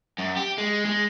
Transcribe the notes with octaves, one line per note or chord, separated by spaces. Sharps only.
F#2
G4
G#3
G#3